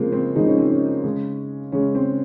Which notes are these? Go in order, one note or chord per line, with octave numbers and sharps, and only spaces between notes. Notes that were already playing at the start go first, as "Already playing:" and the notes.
Already playing: C#3 F3 G#3 A#3 C4
C4
C#3 F3 G#3 D#4
C#4
C4
C#4
C#3 G#3
C#3 G#3 C#4
C4